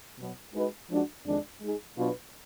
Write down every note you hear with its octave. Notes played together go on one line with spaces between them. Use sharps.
B2 F#3 B3
G#3 D#4 F#4 B4 D#5
F3 G#3 D4 F#4
F2 D#3 G#3 D4
G#3 D#4 G#4
B2 F#3 D4 F4 B4